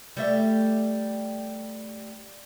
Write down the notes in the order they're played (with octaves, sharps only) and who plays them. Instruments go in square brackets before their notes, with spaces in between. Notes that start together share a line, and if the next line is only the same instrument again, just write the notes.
[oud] G3 A3 E5